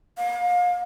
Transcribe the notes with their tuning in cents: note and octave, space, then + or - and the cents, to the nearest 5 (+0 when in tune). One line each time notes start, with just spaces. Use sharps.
F5 +35